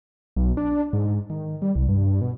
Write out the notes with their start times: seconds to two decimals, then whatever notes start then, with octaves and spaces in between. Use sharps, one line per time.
0.36 B1
0.57 D4
0.93 G#2
1.30 D#3
1.62 G3
1.76 C2
1.89 G2
2.21 B2